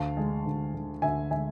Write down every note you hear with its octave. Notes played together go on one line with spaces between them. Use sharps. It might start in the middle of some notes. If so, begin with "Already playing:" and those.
Already playing: D2 F5 A5
D3 G#3
D2
D3 G#3
D2 E5 G#5
D3 G#3 E5 G#5